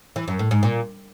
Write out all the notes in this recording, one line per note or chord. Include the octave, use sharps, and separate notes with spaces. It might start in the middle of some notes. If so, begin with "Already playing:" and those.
E3
F#2
A2
G#2
A#2